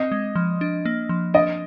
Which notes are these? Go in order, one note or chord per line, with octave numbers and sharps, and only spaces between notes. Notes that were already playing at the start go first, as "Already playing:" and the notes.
Already playing: C4 D#5
G#3
F3
D4
A#3
F3
D4 D#5